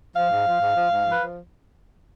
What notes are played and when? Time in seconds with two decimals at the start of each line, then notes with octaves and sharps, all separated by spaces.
0.16 F3 F5
0.31 G#2
0.46 F3
0.61 G#2
0.75 F3
0.91 G#2
1.05 F3
1.12 B4
1.21 F3